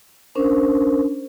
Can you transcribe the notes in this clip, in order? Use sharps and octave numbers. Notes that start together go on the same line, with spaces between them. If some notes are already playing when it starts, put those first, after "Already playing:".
C#4 D4 A#4 C5